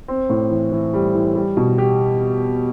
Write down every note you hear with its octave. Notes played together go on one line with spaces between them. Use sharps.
C4
A2
E3
E3
G3
E3
G3
B2
G4